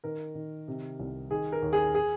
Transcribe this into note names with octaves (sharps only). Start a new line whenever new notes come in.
D#3 A#4
D#3
C3
C2
D#3 G#4
A#4
D#2
G#4
G#4